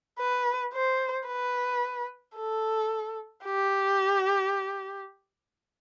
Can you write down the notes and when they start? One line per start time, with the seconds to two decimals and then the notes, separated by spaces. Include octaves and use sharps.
0.19 B4
0.74 C5
1.27 B4
2.37 A4
3.45 G4